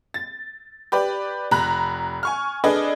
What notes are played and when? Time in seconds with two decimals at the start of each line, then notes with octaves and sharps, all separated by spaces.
0.14 A6
0.92 G4 B4 D5
1.51 F1 A#5 B5 F#6
2.23 G#5 C#6 F6
2.64 D4 G#4 A4 B4 D5 D#5